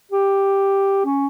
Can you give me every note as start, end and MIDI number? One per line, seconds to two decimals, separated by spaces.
0.11 1.02 67
1.06 1.27 61